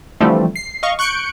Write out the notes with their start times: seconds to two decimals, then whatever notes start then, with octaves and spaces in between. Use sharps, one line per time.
0.20 D3 E3 F3 G3 A3 C4
0.56 C7
0.83 D#5 F5 C#6
0.99 C#6 F#6 G6 C#7 D7